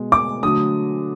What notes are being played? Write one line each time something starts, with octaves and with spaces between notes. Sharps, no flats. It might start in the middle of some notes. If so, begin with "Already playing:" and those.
Already playing: B2 G#3
D6
D3 F#3 A3 D#6